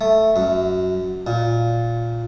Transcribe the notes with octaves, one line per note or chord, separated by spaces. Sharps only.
A3
F#2
A#2